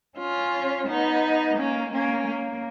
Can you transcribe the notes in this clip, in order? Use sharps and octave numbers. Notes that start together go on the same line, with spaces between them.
C#4 F4
B3 D#4
A#3 C#4
A#3 C#4
A#3